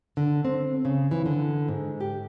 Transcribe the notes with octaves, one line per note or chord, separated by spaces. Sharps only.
D3
C4
C#3
E3
D3
G#2
G4